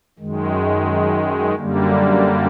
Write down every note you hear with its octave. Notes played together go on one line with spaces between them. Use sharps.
F#2 D#3 G#3
F#2 D3 G3 A#3